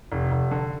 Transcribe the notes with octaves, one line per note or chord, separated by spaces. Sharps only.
F1
F1
D3